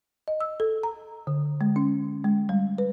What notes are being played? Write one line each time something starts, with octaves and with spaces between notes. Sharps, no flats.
D#5
E6
A4
A#5
D3
G#3
C#4
G#3
G3
B4